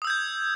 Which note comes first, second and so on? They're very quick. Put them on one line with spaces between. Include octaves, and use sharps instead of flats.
D#6 E6 G6 G#6